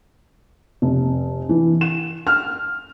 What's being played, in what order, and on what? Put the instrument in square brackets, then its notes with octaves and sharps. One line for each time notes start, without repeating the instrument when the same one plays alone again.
[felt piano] F1
E3
E7
F6